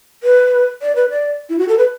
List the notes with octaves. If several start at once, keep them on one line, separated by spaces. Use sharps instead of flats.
B4
D5
B4
D5
E4
F#4
A4
B4